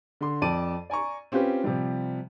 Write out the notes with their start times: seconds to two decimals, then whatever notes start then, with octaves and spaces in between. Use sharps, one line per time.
0.21 D3 C6
0.42 F2 D5 A5 D6 D#7
0.90 D5 G#5 A#5 C#6
1.32 C4 C#4 F4 G4 B4
1.64 C3 F3 G3